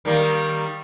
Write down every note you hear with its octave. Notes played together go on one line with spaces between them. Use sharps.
D#3 G3 A#3